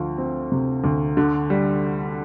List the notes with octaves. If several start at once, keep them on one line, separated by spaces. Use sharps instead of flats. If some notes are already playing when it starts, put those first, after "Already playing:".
Already playing: D2 F3
C4
C3
D2
D3
G3